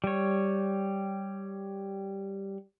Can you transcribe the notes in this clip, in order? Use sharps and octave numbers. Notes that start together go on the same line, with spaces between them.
G3 C#5